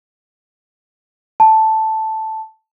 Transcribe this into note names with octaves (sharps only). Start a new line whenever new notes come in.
A5